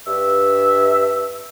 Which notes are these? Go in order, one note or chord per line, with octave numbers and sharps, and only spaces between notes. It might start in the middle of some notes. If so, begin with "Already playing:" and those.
G2 E5